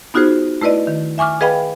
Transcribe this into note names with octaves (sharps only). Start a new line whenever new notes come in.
B3 D#4 F4 F#4 G#4 C5
A3 E4 B4 D5 D#5
D#3
E5 G#5 C#6 D6 F6
G#4 B4 D#5 F5 G5 B5